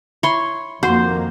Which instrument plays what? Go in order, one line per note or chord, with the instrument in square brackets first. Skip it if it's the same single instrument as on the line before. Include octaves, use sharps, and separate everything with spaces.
[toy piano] E4 E5 B5 [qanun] C#5 C6
[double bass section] F2 D#3 A#3 [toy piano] F#4 F#5 C#6 [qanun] C5